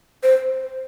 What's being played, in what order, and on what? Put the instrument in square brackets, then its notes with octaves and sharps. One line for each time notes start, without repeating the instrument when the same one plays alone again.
[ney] C5